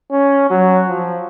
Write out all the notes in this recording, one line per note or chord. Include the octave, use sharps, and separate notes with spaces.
C#4
F#3
F3